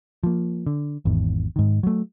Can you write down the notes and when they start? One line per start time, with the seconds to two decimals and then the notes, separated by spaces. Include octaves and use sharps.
0.24 F3 A#3
0.67 D3
1.05 G#1 E2 G#2
1.56 G#2 D#3
1.83 F#3 A3